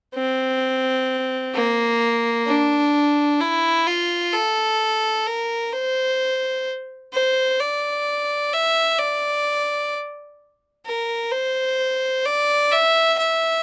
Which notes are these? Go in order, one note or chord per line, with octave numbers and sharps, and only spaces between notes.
C4
A#3
D4
E4
F4
A4
A#4
C5
C5
D5
E5
D5
A#4
C5
D5
E5
E5